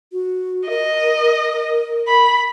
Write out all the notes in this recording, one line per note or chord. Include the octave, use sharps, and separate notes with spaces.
F#4
A#4 D#5
B5